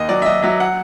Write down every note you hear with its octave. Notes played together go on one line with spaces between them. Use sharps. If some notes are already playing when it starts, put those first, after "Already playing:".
Already playing: D#2 D#5
F#3 D5
E5
F#3 D#5
F#3 E5
F#5